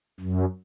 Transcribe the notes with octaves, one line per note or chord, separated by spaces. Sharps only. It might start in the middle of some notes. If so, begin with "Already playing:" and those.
F#2